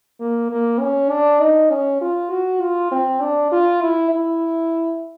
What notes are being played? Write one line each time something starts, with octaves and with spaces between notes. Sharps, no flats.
A#3
A#3
C#4
D4
D#4
C#4
F4
F#4
F4
C4
D4
F4
E4
E4